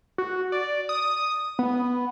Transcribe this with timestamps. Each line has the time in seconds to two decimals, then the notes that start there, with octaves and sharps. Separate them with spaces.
0.18 F#4
0.52 D5
0.89 D#6
1.59 B3